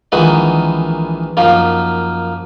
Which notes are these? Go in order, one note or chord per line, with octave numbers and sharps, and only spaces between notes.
A#1 D#3 E3 G#3 D#4 F#5
F#2 F3 A#3 D#4